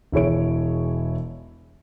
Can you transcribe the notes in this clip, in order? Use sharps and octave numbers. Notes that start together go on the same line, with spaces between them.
E1 E4 G#4 C#5 D7